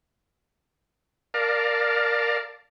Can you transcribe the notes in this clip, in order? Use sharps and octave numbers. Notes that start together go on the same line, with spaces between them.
A#4 D5 F5 A5